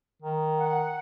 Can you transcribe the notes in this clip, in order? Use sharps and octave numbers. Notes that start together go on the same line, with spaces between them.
D#3
F#5